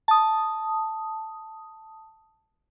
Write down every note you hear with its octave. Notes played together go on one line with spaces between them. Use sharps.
A5 D#6